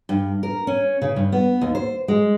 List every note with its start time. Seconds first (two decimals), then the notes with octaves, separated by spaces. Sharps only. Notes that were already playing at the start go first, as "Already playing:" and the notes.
0.09 G2
0.43 A#4
0.67 C#4
1.02 C#3
1.16 G2
1.32 B3
1.61 D#2
1.75 C5
2.08 G#3